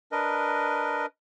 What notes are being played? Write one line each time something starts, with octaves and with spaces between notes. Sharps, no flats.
D4 A#4 B4 D#5